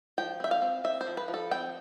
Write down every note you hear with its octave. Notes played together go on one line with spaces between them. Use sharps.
F3 G5
C4 E5
F5
C4
C4 E5
C5
F3
B4
F3
A4
C4 G5